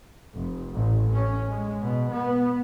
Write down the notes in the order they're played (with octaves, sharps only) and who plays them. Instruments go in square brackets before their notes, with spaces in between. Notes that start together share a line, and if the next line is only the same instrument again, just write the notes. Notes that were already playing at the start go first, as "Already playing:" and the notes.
[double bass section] F1
A1
C#4
G#3
B2
B3